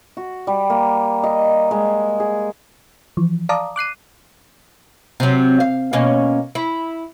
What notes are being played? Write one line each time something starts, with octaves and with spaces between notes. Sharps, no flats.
F#4
G3
A#3
D#5
G#3
G#4
E3 F3
D5 F5 A5 A#5 D6 D#6
D6 F#6 C7 D#7
C3 F#3
F5
B2 A#3 C#4
E4